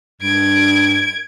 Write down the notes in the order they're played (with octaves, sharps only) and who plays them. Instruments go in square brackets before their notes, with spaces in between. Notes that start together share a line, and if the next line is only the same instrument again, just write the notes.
[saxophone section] G2 [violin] G#6 D7